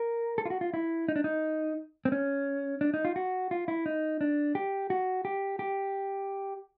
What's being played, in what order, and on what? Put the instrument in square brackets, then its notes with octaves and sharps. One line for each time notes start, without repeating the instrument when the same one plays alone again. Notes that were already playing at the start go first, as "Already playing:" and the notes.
Already playing: [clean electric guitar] A#4
A4
F4
F#4
F4
E4
D#4
D4
D#4
C4
C#4
D4
D#4
F4
F#4
F4
E4
D#4
D4
G4
F#4
G4
G4